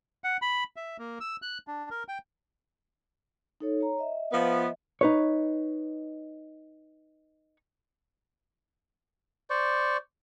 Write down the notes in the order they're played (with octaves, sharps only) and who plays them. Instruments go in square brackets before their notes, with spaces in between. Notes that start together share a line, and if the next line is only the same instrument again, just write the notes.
[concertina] F#5
B5
E5
A#3
E6
F#6
D4
A#4
G5
[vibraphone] D#4 A4 C#5
C#5 A#5
D#5 E5
[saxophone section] F3 B3
[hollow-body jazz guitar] D#4 B4 C#5
[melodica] C5 D5 C#6